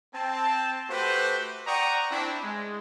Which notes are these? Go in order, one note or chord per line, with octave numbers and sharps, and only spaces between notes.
C4 A5
A3 F#4 G4 B4 C5
D5 F#5 G5 A#5 C#6 D#6
C4 D4 E4
G#3